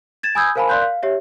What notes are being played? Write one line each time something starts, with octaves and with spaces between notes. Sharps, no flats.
G#6 A6 E7
G#5 B5 D#6 E6 G6 G#6
A#4 C5 F5 G#5 A5 B5
A#4 D5 F5 C6 F#6 G6
F5
G4 C#5 E5